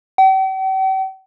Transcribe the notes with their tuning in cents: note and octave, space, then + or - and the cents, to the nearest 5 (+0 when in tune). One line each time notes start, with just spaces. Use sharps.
G5 -45